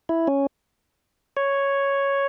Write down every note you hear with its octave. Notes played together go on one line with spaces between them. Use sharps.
E4
C#4
C#5